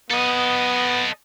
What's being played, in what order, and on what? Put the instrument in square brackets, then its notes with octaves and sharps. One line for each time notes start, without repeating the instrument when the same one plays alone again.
[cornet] B3 [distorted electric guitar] A4 D#5